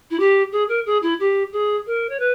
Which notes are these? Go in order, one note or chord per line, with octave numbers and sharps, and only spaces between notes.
E4
G4
G#4
A#4
G#4
E4
G4
G#4
A#4
C#5
B4